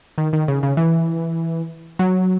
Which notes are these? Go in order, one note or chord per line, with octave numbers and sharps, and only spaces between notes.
D#3
D#3
C#3
C#3
E3
F#3